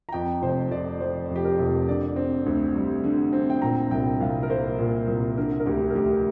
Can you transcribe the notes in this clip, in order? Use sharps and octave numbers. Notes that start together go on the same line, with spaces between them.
A#5
F2 G5
F1 C5
F1 D5
F3 C5
F2
G4
A#4
F1
D3 D5
C4
D2
G3
D3
C4
G5
A#2 A#5
C2 G5
C2 F5
A#4
A#3 C5
A#2
C2 A#4
D3 A#4
A#4
D2 G4
A#4
D2 G4